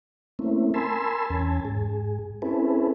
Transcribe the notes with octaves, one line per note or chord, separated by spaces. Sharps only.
A3 A#3 C4 C#4 E4
A#4 G#5 A5 B5 C6 E6
E2 C#4 G#5 A5
G#2 G#4
C4 C#4 E4 G#4 A4 B4